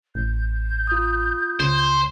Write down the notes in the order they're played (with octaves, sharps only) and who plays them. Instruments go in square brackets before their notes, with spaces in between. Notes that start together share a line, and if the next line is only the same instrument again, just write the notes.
[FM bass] A1 [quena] G6
[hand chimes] F4 D#6
[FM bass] C#2 [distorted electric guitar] C5